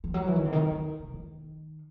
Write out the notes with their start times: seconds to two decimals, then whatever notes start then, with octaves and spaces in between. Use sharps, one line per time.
0.04 E3
0.14 F#3
0.28 E3
0.36 D#3
0.45 C3
0.52 D#3
0.71 D#3
1.00 C3
1.14 D#3